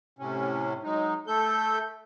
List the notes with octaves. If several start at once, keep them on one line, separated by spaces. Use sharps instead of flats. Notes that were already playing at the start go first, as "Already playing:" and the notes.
A2 C3 C#4
F#3 G#3 D#4
A3 A4 G6